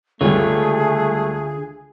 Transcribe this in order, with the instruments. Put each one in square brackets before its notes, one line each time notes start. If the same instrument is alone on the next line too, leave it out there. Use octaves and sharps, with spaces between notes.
[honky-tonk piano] C#2 G3 [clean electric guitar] D3 F4 C#5 [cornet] A3 [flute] G#4